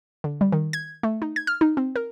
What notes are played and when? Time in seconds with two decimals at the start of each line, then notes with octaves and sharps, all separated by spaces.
0.24 D3
0.41 G3
0.52 D#3
0.73 G#6
1.03 A3
1.22 D#4
1.36 G#6
1.47 F6
1.61 D#4
1.77 C4
1.96 A#4